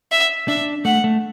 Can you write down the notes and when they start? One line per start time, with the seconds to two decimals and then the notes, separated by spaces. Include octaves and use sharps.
0.12 E5
0.48 D4 E5
0.85 A3 F#5
1.04 A3